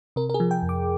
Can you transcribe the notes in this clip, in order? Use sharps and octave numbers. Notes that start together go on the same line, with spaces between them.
C3 A#4
A#4
G#4
F3
G5
F2
D6